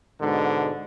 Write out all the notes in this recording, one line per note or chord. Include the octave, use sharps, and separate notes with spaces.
G#2 B2 D3